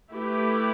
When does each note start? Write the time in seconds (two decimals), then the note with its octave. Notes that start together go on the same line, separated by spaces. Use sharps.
0.13 A3 E4 G4 B4